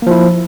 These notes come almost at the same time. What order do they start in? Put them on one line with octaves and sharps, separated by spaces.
A#3 F3 E4